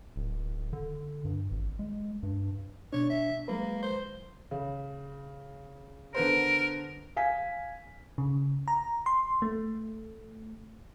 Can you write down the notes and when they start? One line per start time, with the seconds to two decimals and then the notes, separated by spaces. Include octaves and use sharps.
0.16 D1
0.73 D3
1.25 G2
1.51 G#1
1.79 G#3
2.23 G2
2.93 B2 D4 C#5
3.10 E5
3.48 F#3 G#3 A#3 B4
3.83 C5
4.51 C#3
6.14 D3 B3 A#4 C5
7.16 F5 G#5 B6
8.18 C#3
8.68 A#5
9.06 C6
9.42 A3